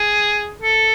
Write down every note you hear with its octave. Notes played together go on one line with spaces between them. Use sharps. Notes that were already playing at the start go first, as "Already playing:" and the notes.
Already playing: G#4
A4